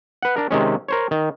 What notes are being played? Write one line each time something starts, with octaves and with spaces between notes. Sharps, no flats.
B4 F#5
D4 A#4
C3 D#3 G#3 C#4
A#4 C5 C#5
D#3